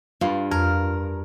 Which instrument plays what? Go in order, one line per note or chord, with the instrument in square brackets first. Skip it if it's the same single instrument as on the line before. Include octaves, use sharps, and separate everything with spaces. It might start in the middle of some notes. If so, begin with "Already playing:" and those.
[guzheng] G2 [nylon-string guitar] F4 F5
[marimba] F2 [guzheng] A#4